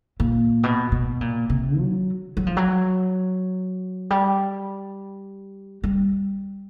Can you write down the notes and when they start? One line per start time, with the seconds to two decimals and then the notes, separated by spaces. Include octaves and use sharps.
0.20 A#2
0.63 B2
0.92 B2
1.21 A#2
1.50 C3
1.79 F#3
2.37 F#3
2.47 F3
2.57 F#3
4.10 G3
5.83 G3